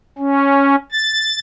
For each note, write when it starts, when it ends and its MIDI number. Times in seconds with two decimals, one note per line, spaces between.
0.18 0.76 61
0.92 1.39 93